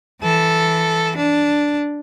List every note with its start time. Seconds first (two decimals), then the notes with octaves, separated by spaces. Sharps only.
0.22 E3 A4
1.17 D4